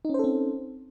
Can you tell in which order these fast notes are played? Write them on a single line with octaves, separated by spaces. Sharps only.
D#4 C#4 C5 A4 C4